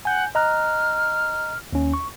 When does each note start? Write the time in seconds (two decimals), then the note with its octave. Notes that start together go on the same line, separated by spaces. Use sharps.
0.05 F#5 G#5 G6
0.35 D#5 A#5 F6 F#6
1.73 D#2 C#4
1.93 C#6